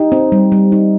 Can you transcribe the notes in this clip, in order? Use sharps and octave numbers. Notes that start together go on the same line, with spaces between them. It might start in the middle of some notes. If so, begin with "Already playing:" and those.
Already playing: D#4 G4
C4
G3
G3
D#4